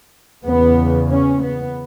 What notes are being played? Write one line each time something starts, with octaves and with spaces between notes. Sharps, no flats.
E2 C#3 B3
C#4
B3